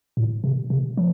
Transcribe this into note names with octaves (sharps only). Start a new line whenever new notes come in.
A2
C3
C3
F3